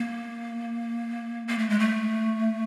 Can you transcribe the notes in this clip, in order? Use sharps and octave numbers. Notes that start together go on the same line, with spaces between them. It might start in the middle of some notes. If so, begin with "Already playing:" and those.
Already playing: A#3
A#3
A3
G#3
A3